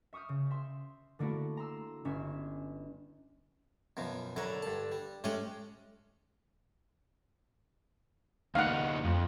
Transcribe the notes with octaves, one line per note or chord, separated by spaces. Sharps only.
E5 C#6 D#6 F6 G6
C#3
E5 C6
D3 A3 A#3 E4 F#4
A#5 C6 E6
G1 C#4 E5 E7
F#2 B2 F3
F#2 D3 A#4 B4 C#5
G2 A5
G3
G#3 A3 C#4 G4
D2 D#4 F5 F#5
F2